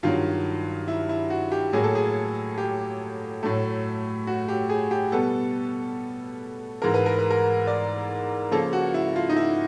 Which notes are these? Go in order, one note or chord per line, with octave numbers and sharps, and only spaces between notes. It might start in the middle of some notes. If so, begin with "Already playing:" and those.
G2 D#3 F#3 F4
E4
E4
F#4
G4
A2 F#3 A#3 G#4
A4
G#4
G4
A2 F#3 A3
F#4
G4
G#4
G4
B2 G3 B3 A4
G#2 E3 G#3 A#4
B4
A#4
B4
A#4
D5
C#3 F3 A#3 A4
F#4
E4
F4
D#4
E4